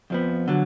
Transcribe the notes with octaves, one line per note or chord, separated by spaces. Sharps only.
F2 F3 B3
D3 F#3